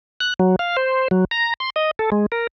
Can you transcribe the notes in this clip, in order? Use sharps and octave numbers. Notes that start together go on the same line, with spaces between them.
F#6
F#3
F5
C5
F#3
A#5
C6
D#5
A4
G#3
A#4